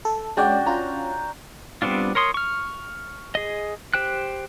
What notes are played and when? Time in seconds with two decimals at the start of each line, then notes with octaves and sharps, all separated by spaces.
0.05 A4
0.37 G#3 C#4 D4 F#4 D5 G5
0.66 C#4 F4 A#5
1.82 G3 B3 C4 D4 F4
2.15 A#4 C#5 C6 D#6
2.34 C#6 F6
3.35 G#4 D#5
3.94 G4 C5 G5 F#6